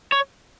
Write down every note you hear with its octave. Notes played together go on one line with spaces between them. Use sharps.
C#5